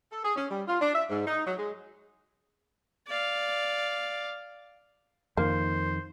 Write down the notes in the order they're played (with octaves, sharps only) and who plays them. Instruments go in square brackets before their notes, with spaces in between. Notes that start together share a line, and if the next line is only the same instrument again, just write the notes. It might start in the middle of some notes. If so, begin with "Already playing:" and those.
[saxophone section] A4
G#4
C#4
G3
F4
D4
E5
G#2
D#4
F#3
G#3
[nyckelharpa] D5 F5
[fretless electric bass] F2 D#3 [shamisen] A#3 [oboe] C5